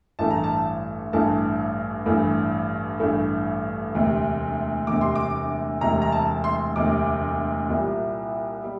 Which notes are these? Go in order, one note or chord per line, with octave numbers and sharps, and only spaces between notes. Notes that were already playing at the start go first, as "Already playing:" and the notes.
A1 G2 E3 A3 A5
A#5
A5
A1 G2 E3 A3 A5
A1 G2 E3 A3
A1 G2 E3 A3
E1 D2 C3
E1 D2 C3 D6
C6
D6
E1 D2 C3 A#5
A#5
A5
C6
E1 D2 C3 D6
C2 A#2 G3
G3